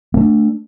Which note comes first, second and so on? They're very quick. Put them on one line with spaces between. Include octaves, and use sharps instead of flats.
A#3 A3 D4